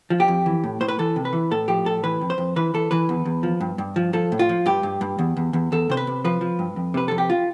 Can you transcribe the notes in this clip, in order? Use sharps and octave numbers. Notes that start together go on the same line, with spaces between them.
F3
G4
F2
E3
A2
A2 C5
B4
E3 A4
C3
B4
E3
A2 A4
F3 G4
A2 A4
E3 B4
F2
C5
F2
E3 B4
E3 A4
E3 B4
E2
E2
F3
G2
G2
F3
F3 A4
A2
F4
F3
G2 G4
G2
G2
E2
E2
E2
E2 A4
C3 C5
B4
C3
F3 B4
F3
G2
F2
C3 B4
F2 A4
G4
F4